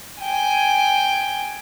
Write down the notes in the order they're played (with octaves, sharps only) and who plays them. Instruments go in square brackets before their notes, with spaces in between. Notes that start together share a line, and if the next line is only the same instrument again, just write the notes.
[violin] G5 G#5